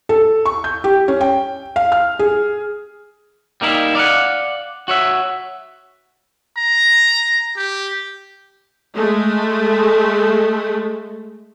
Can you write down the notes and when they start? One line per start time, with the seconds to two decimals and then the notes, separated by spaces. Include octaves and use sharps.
0.09 A4
0.46 C#6
0.64 G6
0.84 G4
1.08 C#4
1.21 G5
1.76 F5
1.92 F6
2.19 G#4
3.61 G3 A#3 D#4 E4
3.95 D5 F5 F#5
4.88 F#4 C#5 E5
6.57 A#5
7.57 G4
8.95 G#3 A3